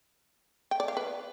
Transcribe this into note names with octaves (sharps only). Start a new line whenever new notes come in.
G5
D5
F5
B4